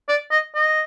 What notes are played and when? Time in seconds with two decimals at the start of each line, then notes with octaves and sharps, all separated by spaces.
0.09 D5
0.31 D#5
0.55 D#5